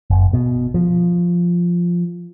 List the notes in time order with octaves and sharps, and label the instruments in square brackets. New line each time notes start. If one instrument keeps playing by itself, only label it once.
[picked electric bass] F#1
B2
F3